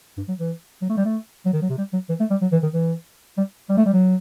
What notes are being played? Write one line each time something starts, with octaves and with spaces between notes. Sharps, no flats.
G2
F#3
E3
F#3
A3
G3
A3
F#3
D#3
F#3
C3
G3
F#3
E3
A3
G3
F#3
E3
D#3
E3
G3
G3
A3
G3
F#3